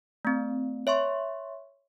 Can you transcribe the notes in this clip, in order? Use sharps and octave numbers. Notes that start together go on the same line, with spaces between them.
A3 C4
C#5 E5 C6 C#6